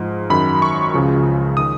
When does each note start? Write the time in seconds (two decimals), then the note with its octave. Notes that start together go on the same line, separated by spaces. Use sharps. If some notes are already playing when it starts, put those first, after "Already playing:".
Already playing: G#2 F3
0.30 F#2 D#3 B5
0.62 C#6
0.94 C#2 C#3 F3
1.57 D#3 D#6